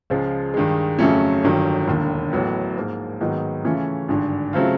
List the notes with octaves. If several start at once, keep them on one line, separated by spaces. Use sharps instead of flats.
C#2 C#3 F3 G#3
G2 D#3 G#3
F2 C#3 F#3 A3 C#4
G1 G2 D#3 F#3
E1 D#2 D3
A1 A2 F#3 B3
G#2 F3 A#3
G#2 D#3 F#3 B3 D#4
C#3 E3 A3 C#4 F4
G#1 G2 D3
C#3 F#3 A3 C4 F4